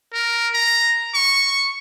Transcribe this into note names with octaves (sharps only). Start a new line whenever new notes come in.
A#4
A#5
C#6